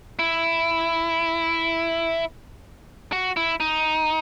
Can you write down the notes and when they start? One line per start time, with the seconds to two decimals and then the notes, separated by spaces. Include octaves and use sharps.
0.19 E4
3.13 F#4
3.37 E4
3.60 D#4